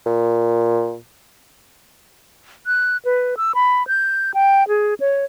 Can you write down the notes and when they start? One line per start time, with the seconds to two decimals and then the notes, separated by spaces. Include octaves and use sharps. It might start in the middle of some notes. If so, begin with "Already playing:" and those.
0.06 A#2
2.67 F#6
3.05 B4
3.37 E6
3.55 B5
3.87 G6
4.34 G5
4.68 G#4
5.00 C#5